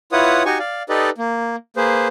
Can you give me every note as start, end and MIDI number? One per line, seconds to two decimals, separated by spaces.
0.12 0.43 64
0.12 0.43 65
0.12 0.43 71
0.12 0.43 73
0.12 0.43 78
0.12 0.43 87
0.45 0.58 63
0.45 0.58 66
0.45 0.58 67
0.45 0.58 80
0.45 0.58 85
0.59 0.83 74
0.59 0.83 77
0.89 1.10 63
0.89 1.10 67
0.89 1.10 69
0.89 1.10 71
0.89 1.10 74
0.89 1.10 75
1.18 1.56 58
1.77 2.08 58
1.77 2.08 68
1.77 2.08 71
1.77 2.08 72